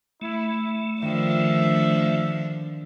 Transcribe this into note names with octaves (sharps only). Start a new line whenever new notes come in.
A3 E4
D3 D#3 F3 D4 E5